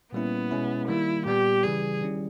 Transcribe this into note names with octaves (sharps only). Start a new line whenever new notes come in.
A#2 G3 A#3 B3 C#4 E4
B2 G#3 C#4 E4
D#3 G3 A#3 E4
A#2 G3 B3 G4
C#3 E3 G3 G#4
D#3 G3 C#4 E4